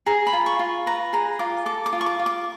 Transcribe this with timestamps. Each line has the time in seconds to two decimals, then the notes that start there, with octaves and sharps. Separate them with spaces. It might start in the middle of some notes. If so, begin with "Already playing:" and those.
0.06 G#4 A#5
0.27 B5
0.33 F4
0.46 C#6
0.59 F4
0.86 B4 A#5
1.13 G#4 A#5
1.39 F4 D6
1.66 A4 D6
1.86 D6
1.93 F4
2.01 C#6
2.06 D6
2.19 F4
2.26 D6